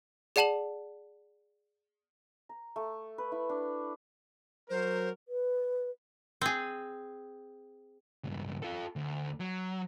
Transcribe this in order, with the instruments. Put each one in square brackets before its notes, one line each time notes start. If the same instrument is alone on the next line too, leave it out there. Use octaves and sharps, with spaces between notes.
[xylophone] G#4 D5 F#5 A5 E7 F#7
[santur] A#5
A3
B4
E4
D4
[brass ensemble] F#3 A#4 [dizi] C5
[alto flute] B4
[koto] C4 G#4
[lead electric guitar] C#2 G2
F4 A4
D2
F#3